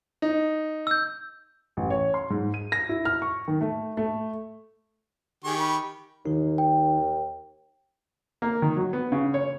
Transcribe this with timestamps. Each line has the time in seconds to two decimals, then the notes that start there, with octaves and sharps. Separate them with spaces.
0.22 D#4
0.87 E6 G6
1.77 A1
1.90 C#5
2.14 C6
2.30 G#2
2.54 D#7
2.72 A#6
2.89 E4
3.05 F6
3.22 C#6
3.48 D#3
3.61 A3
3.97 A3
5.44 D#3 G4 G#4 C#6
5.58 B5
6.26 D#2 D#3 D#4
6.58 G5
8.42 A#3
8.62 D#3
8.76 F#3
8.93 B3
9.12 C#3
9.34 C#5